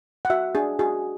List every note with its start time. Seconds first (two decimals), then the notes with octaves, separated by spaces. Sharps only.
0.25 F#5
0.30 F#4 E5
0.55 D4 G#4
0.79 F#4 G#4